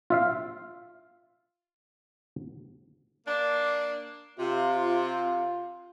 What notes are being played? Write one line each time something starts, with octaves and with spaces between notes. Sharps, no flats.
F4 E5 F5
A#3 D4
C3 F4